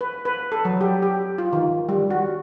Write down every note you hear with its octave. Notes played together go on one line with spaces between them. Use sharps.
B4
B4
A4
F#3
G4
G4
F4
D#3
G3
F#4